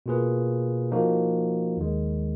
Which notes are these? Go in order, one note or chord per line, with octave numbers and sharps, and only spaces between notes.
B2 A#3 F4 G#4 B4
F3 A#3 D#4 F#4
D#2 D#3 G#3